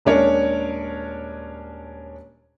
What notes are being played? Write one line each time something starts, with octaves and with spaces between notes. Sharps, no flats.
D#1 G#3 C#4 D4 A#4 C#5